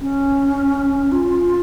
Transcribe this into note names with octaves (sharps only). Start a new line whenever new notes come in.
C#4
F4